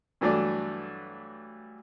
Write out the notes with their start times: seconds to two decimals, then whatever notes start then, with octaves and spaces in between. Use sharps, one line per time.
0.21 G2 E3 F#3 A3 D4 D5